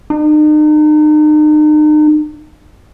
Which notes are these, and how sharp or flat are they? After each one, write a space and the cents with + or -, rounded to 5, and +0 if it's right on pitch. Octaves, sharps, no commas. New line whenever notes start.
D#4 -40